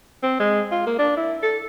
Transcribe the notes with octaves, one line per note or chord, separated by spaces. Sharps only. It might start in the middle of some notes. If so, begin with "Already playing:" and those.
C4
G#3
F4
A#3
D4
E4
A4